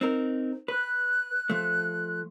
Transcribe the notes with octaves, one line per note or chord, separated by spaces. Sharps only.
C4 D#4 A#4
B4 F#6
F3 A3